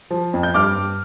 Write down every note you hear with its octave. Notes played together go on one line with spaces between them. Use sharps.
F3
F2
G6
G2 D6 F6
G2